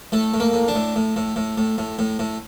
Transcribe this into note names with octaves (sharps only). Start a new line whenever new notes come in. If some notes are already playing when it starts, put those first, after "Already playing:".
A2 A3
A2
A#3
A2
D4
A2
A2
A2
A2
A2
A2
A2
A2